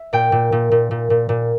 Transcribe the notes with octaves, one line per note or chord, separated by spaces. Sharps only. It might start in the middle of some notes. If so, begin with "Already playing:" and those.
Already playing: E5
A#2 G5
A#2
A#2
A#2
A#2
A#2
A#2